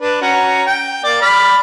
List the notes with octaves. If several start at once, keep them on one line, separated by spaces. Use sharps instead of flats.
D4 B4
C#4 F#4 A#5
G5
A#3 D5
D5 B5 F6